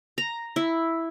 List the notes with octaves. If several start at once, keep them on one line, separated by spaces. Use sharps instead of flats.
A#5
E4